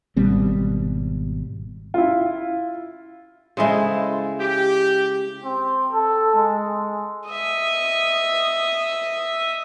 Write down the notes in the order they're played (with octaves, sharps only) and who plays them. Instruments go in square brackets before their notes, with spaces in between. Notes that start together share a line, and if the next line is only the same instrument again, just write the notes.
[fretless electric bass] G#1 B2 G3 C4
[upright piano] E4 F4
[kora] C#3 E4 A4 [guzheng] G#3 G#4 C5
[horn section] G4
[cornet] C4
A4
G#3
[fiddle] D#5 E5